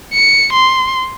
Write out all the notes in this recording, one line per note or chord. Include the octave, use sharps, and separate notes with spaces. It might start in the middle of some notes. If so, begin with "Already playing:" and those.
C#7
C6